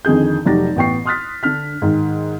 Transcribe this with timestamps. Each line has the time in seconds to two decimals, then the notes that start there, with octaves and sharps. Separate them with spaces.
0.05 F2 D3 D#3 G#4 G6
0.46 F1 F#3 D#4 G4 A6 A#6
0.76 A1 B3 G5 C#6 C7
1.06 C6 D#6 F6 F#6 A6 B6
1.43 D3 D4 F6 B6
1.82 G#2 D#3